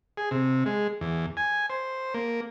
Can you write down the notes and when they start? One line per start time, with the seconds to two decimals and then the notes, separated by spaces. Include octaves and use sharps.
0.17 G#4
0.31 C3
0.66 G#3
1.01 E2
1.37 G#5
1.70 C5
2.14 A#3